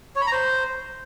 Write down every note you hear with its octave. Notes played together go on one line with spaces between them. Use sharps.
C#5
B5
A#5
C5